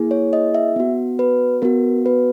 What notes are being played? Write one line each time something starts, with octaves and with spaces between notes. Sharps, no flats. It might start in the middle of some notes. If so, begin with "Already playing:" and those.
Already playing: A#3 E4 G#4
C#5
D#5
E5
B3 F#4
B4
B3 F#4 A#4
B4